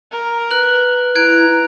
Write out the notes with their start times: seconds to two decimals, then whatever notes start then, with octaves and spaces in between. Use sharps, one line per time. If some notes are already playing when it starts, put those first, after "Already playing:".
0.11 A#4
0.51 B4 F#6 F#7
1.15 E4 A#5 F#6 G#6 D7